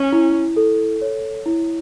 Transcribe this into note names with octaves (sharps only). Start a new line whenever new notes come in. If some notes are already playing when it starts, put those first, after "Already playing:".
Already playing: C#4
E4
A4
C#5
E4